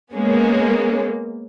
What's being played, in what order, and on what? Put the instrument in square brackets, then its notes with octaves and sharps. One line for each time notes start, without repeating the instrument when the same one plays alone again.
[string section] G#3 A#3 B3 C#4